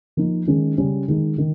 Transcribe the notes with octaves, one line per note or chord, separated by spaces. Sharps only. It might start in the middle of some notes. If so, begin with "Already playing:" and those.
F3 A#3 D#4
D#3 G#3 C#4
C#3 G3 C#4
D#3 G#3 D#4
D#3